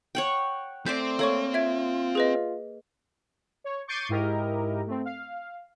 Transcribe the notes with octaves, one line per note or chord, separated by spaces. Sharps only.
C#5 F#5 G5
A3 C4 C5 D5 D6 G6 B6
A#3 A4 C#5 C#6
F4 E5 G#6 D7
G#4 B4 D#5
C#5
C#6 D6 G6 A6 C7 D#7
G#2 E4 G4 A#4 D#5
A3 C4
F5